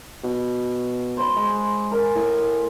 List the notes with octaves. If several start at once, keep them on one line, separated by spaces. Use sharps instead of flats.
B2
C5 B5
G#3
A#4 G#5
A2